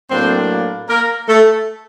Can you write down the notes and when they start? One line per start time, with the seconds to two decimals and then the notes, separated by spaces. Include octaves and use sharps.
0.10 A2 F#3 A#3 C4 D4 C5
0.88 A#3 A#4
1.28 A3 A4